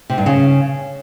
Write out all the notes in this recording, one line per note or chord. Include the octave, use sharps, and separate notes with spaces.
C3
G2
C#3